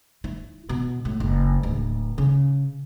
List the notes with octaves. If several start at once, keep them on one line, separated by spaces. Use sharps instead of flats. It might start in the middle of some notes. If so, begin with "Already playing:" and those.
E4
B2
A2
F#1
D1
C#3